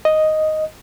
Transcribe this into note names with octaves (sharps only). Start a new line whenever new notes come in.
D#5